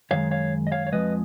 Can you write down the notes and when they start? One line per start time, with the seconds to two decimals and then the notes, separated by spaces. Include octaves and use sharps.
0.11 F#2 D#3 G#3 C#5 F5
0.31 C#5 F5
0.67 D#5
0.72 C#5 F5
0.87 C#5
0.92 F2 C#3 F3 G#3 B4 D#5